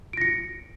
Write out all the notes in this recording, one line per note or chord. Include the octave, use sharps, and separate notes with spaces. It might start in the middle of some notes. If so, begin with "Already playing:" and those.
A#6 C#7 D7